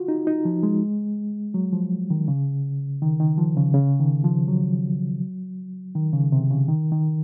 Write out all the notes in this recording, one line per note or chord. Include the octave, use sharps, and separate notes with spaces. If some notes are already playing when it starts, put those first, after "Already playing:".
Already playing: F4 F#4
D#4
D#4
F3
G#3
F#3
F3
D#3
C#3
D#3
D#3
F3
C#3
C#3
D#3
F3
F#3
D#3
C#3
C3
C#3
D#3
D#3